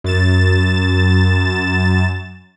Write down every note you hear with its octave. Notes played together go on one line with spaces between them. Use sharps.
F#2 A6 E7